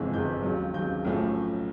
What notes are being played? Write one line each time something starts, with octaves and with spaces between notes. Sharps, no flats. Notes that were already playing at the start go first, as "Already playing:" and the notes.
Already playing: G1 F2 C3 E3 G#3
G1 F2 C3 E3 G#3 G6
D#2 C#3 F#3
D#2 C#3 F#3 G6
B1 A2 F3 A3 C#4